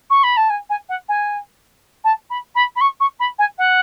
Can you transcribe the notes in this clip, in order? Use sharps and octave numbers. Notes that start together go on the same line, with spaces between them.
C#6
B5
A5
G#5
G#5
F#5
G#5
A5
B5
B5
B5
C#6
C#6
B5
G#5
F#5